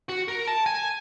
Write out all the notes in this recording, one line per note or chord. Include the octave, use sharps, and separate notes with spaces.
F#4
A#4
A5
G#5